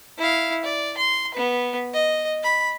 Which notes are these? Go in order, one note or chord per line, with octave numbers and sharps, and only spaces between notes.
E4 F5
D5
C6
B3 B4
D#5
B5